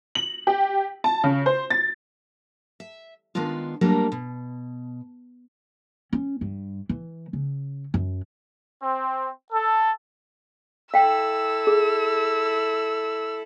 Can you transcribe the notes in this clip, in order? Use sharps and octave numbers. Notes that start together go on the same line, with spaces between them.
F#7
G4
A5
C#3
C5
A6
E5
D#3 G#3 B3 D4 F4
F#3 G3 A3 A#3 D4 A#4
B2
C#4
G2
E3
C#3
F#2
C4
A4
E4 A4 F5 G5 E6
G#4